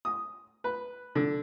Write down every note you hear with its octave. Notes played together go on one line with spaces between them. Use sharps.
D#6
B4
D3